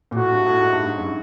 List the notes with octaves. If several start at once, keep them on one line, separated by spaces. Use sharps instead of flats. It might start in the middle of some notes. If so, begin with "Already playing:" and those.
A#2
A2 F#4
G2
A2
G#2
G2
G#2
F#2